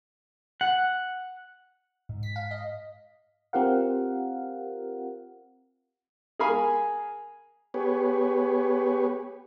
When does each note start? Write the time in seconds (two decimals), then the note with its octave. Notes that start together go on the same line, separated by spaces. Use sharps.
0.61 F#5
2.09 G#2
2.23 B6
2.36 F5
2.51 D#5
3.53 C4 F4 G4 A#4 F5 F#5
6.39 G#4 A#4 F5 G#5 B5
7.74 B3 G4 G#4 B4 C#5